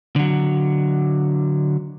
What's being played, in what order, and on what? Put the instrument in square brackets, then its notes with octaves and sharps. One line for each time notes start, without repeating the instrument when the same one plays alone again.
[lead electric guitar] D3 F#3